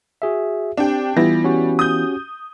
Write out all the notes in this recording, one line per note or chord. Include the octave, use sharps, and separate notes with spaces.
F#4 G#4 E5
C4 D4 G4 G5
E3 G3 B3 E4 F4 A#6
C#4 F#4 G4
D#6 G6